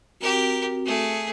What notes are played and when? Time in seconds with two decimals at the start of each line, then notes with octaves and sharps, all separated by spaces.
0.20 C4 F#4 G4 A#4
0.85 A3 G#4